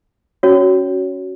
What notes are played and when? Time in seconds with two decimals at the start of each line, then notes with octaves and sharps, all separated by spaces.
0.43 C#4 F#4 C#5